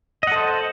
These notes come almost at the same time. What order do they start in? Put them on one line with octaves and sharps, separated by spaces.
D#5 F#5 A4 C5